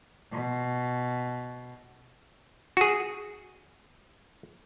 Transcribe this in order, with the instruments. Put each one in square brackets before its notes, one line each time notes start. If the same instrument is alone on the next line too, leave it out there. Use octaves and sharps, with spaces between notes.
[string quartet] B2
[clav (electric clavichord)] F#4 G#4